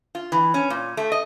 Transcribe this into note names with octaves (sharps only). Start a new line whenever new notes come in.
F4
E3
C#4
A#2
A3
D#5